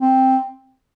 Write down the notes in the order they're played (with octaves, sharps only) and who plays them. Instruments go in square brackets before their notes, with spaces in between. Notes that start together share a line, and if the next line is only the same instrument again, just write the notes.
[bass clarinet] C4